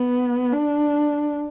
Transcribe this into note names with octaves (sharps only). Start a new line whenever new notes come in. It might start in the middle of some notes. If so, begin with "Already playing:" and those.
Already playing: B3
D4